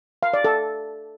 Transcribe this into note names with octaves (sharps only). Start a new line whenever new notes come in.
F5
D5
A4